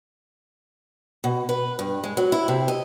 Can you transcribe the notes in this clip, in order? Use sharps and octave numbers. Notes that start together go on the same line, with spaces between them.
B2
B4
G2
G#3
F#3
E4
C3
D#5